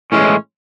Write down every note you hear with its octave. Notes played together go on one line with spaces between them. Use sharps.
A2 E3 G#3 C#4